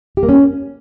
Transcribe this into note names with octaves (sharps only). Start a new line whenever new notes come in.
G4
A#3
C#4